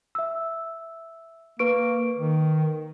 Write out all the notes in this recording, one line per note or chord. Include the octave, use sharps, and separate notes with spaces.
E5 E6
A#3 B4 C#6 D7
D#3